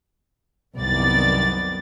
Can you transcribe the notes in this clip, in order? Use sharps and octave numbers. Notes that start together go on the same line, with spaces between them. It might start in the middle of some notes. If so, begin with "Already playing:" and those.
C2 F#2 D#3 B3 D5 A6